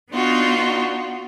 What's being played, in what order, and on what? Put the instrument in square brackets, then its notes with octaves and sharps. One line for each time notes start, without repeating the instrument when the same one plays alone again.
[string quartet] B3 D4 D#4 F4 F#4